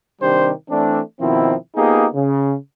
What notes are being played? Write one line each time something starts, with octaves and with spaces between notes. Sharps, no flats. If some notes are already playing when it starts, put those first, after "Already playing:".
C3 D#3 G3 D4 G4 C5
E3 A3 C4 D4
B2 D#3 F3 C4 E4
A#3 B3 D#4 F4 G4 G#4
C#3